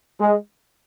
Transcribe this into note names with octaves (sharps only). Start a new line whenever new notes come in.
G#3